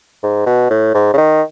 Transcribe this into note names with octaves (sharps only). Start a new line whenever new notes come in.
G#2
B2
A2
G#2
C#3
D#3